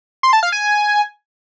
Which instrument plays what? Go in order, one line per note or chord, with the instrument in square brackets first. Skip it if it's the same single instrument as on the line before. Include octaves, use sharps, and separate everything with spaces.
[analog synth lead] C6
A5
F5
G#5